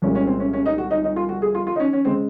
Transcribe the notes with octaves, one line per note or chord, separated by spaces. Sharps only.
C2 A#2 G#3 C#4
C#4
C4
C#4
C#4
D#4
F#4
D#4
D#4
F4
F#4
G#4
F4
F4
D#4
C#4
C#4
C#3 G#3 C4